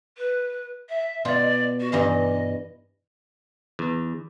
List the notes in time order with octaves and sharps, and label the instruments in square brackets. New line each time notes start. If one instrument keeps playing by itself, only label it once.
[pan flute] B4
E5
[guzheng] B2 F4 [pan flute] D5
[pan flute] F#4
[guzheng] G2 E3 F5 [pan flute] D#5
[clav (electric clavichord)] E2